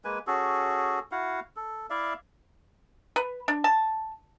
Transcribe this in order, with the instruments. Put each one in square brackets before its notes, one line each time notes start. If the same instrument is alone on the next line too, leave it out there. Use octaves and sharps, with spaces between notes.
[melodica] G#3 A#3 B4 G#5
C#4 F#4 G#4 A4
E4 F#4 F5 F#5
A4
E4 D5 E5 F5
[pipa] B4
D4
A5